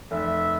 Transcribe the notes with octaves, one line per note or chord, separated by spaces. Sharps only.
F1 E5